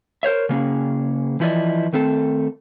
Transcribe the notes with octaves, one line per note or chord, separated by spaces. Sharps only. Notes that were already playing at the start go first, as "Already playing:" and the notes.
A#4 C5 C#5 E5
C#3 A#3 C#4 G#4
E3 F3 E4 A4 D5 D#5
D#3 A3 C4 A4